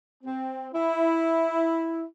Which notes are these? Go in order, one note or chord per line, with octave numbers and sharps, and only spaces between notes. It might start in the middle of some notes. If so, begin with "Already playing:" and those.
C4
E4